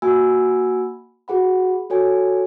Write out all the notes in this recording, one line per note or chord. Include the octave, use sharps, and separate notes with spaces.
A#3 F#4 F#5 G#5 B5 E6
F#4 G#4 F#5 B5
F#4 A4 C#5 G#5